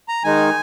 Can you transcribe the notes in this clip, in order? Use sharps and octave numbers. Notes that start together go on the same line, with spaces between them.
A#5
D#3 G#3 D#4 G#5